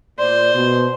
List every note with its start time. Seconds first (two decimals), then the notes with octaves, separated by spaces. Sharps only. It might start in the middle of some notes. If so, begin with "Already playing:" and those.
0.19 A#2 C5 D5
0.55 B2